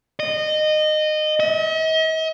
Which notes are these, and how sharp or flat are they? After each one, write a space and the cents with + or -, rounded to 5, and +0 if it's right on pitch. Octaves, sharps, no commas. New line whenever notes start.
D#5 -20
D#5 +45